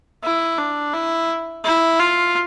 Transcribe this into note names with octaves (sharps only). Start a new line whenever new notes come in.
E4
D4
E4
E4
F4